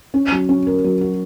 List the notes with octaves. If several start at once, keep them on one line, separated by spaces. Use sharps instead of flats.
C#4
F#3
C#4
A#4
F#3
F#4